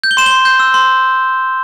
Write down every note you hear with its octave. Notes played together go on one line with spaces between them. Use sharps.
G6
G7
C6 E7
G7
C6
G6
E6
C6